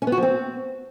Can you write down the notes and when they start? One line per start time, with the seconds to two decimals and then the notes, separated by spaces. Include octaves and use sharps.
0.02 C#4
0.07 B3
0.12 F#4
0.17 F3
0.23 C4